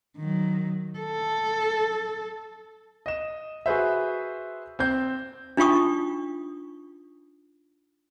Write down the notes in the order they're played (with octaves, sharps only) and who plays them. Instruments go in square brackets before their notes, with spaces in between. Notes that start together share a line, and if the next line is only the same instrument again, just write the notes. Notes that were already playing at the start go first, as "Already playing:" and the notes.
[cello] D#3 F#3
A4
[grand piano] D#5 E7
F#4 G#4 B4 C5 E5
C4 C5 G6
[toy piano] D4 D#4 F4 G5 C#6 D#6